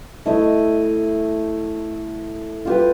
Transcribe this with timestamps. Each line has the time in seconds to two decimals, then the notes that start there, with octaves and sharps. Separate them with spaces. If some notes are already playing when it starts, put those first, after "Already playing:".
0.26 A3 E4 D#5
2.65 F4 G4 B4